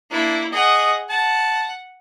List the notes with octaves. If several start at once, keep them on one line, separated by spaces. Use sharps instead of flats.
A#3 D4 E4
G#4 D#5 F#5
F#5 A5